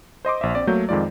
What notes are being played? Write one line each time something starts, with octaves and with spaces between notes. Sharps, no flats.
C5 D#5 C6 D6
A#1 E5
C4 D5
F#3 A3 A#3 G6
F2 D#3 G#3 F4 D5